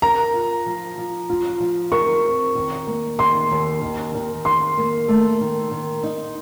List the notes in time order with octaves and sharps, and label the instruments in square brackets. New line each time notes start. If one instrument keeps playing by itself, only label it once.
[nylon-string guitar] A#4 [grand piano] A#5
[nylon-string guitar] F4
F3
F3
F4
F3
[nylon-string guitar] A#4 [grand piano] C#6
[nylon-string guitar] C4
D#3
A#3
[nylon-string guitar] D#3 [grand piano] C6
[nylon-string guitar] D#2
D#3
D#3
[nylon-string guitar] D#3 [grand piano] C6
[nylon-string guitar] A#3
A3
D#3
D#3
D#4